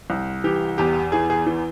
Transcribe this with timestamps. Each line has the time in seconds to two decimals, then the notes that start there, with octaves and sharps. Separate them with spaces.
0.10 C2
0.44 E3 G4
0.78 E2 G4
1.12 E3 G#4
1.30 G#4
1.47 E3